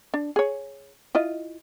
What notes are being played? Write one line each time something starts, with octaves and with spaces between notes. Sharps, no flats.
D4
G#4 C#5
E4 F4 D#5